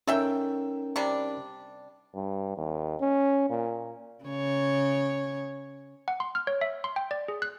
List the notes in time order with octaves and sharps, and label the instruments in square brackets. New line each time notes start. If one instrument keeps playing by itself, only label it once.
[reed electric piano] C#4 D#4 A#4 [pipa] A4 E5 G5
[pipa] C3 G3 D4
[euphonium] G2
D#2
C#4
A#2
[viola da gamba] C#3 C#5
[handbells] F#5
C6
F6
C#5
E5
C6
G5
D5
G#4
F#6